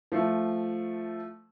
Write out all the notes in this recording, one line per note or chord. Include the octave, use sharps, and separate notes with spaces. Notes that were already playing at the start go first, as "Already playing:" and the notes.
F3 A3